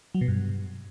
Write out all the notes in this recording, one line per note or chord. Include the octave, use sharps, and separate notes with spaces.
F#3
B2
G2